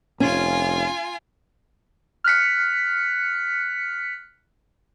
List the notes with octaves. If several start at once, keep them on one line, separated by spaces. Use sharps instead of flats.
F1 C#4 F4 G#5
F6 F#6 B6 C#7